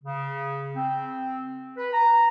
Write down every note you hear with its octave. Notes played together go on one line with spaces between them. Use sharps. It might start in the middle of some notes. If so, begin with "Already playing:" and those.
C#3
C4
B4
A#5